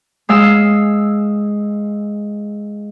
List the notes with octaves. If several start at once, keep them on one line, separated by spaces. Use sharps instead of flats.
G#3 F5 E6